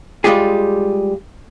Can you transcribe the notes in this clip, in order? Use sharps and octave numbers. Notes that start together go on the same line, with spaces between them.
G3 G#3 F4 G4 G#4